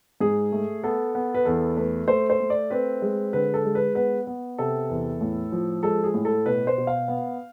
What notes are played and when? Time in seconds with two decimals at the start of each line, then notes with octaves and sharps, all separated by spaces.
0.20 G#2 G#4
0.52 A3
0.83 B3 A4
1.15 B3
1.34 B4
1.45 E2 A4
1.77 A3 B4
2.08 A3 C5
2.30 C5
2.40 A3
2.50 D5
2.70 C4 B4
3.02 G#3
3.33 D3 B4
3.54 A4
3.65 G#3
3.75 B4
3.95 B3 B4
4.27 B3
4.58 C3 A4
4.90 E2
5.21 A2
5.52 F3
5.83 G#3 A4
6.04 G#4
6.14 A2
6.25 A4
6.46 B2 B4
6.67 C5
6.78 B2
6.87 F5
7.08 B3